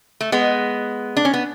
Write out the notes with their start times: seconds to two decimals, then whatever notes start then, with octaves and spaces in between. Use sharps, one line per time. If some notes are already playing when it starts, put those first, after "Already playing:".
0.21 A3
0.32 G#3 B3
1.17 D4
1.25 C#4
1.34 B3